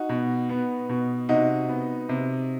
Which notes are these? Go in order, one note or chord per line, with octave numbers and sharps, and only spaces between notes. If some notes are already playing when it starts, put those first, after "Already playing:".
Already playing: D#4 F#4
B2
B3
B2
C3 D#4 F#4
B3
C3